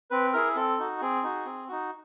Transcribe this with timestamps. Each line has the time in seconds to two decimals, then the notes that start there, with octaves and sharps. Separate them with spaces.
0.11 C4 B4
0.33 E4 G#4 A#4
0.56 C4 A4
0.79 D#4 F#4
1.01 C4 G#4
1.23 D#4 F#4
1.46 C4
1.68 D#4 F#4